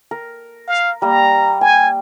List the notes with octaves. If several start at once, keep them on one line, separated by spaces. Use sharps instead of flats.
A#4
F5
G3 A#3 A#5
G5 G#5